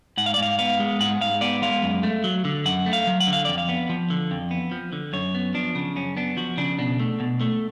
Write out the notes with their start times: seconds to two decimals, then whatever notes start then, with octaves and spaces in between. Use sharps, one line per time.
0.17 G#2 F#5
0.26 F5
0.34 D5
0.38 G#2 F5
0.59 B3 F5
0.80 G#3
1.00 G#2 F#5
1.21 G#2 F5
1.41 B3 D5
1.62 G#3 F5
1.82 F#2
2.03 A3
2.24 F#3
2.45 D3
2.65 F#2 F#5
2.86 A3
2.93 F5
3.07 F#3
3.20 F#5
3.27 D3
3.33 F5
3.45 F2 D5
3.58 F5
3.69 B3
3.89 F3
4.10 D3
4.31 F2
4.51 B3
4.72 F3
4.93 D3
5.13 F#2 C#5
5.34 B3
5.54 F3 D4
5.75 C#3
5.96 F#2 C#4
6.17 B3 D4
6.37 F3 F#4
6.57 C#3 D4
6.79 B2 D4
7.00 A3
7.20 B2
7.41 A3